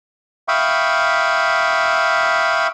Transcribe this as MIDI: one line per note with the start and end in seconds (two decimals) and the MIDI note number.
0.48 2.67 76
0.48 2.67 77
0.48 2.67 79
0.48 2.67 83
0.48 2.67 85
0.48 2.67 87